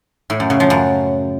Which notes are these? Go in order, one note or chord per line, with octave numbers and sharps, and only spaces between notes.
A2
F#2
C#3
F3
F#2